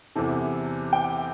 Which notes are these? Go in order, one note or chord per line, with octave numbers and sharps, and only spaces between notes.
E2 C3 E3 A4
G5